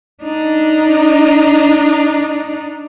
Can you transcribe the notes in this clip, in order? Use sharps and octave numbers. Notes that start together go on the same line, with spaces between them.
D4 D#4